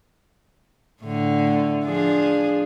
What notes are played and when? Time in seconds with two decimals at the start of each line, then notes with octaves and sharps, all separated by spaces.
1.01 A2 D3
1.85 F3 D4 G#4